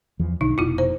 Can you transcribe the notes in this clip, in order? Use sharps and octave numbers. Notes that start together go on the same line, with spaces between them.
E2 E3 F3
B1 D3 D#4
F1 B2 E4 F4
C5